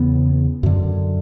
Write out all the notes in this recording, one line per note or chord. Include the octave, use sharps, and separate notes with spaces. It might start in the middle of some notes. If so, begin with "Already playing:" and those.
Already playing: E2 C#3 B3
F#2 D3